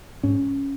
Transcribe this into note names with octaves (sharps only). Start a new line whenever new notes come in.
G#2 C#4